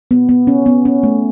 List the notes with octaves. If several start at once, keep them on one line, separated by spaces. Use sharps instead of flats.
B3
B3
C#4
B3
C#4
A3